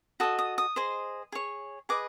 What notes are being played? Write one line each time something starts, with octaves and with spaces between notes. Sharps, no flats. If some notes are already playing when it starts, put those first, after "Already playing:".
F#4 A4 D#5 D#6
D#6
D#6
G#4 C5 D#5
G#4 C#5
G#4 B4 D#5 D6